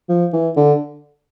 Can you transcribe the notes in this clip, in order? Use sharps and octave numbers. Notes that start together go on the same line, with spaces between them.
F3
E3
D3